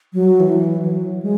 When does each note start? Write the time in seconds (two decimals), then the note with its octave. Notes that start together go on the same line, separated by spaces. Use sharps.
0.14 F#3
0.40 E3
0.82 F#3
1.22 G#3